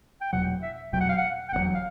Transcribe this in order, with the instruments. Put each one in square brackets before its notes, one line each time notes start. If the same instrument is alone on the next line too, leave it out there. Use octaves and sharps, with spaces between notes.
[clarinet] G5
[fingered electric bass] F1 E2 B2 F#3 [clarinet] F#5
[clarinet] E5
[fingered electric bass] F1 E2 B2 F#3 [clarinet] G5
[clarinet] F#5
F5
F#5
G5
[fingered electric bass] F1 E2 B2 F#3 [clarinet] F#5
[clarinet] F5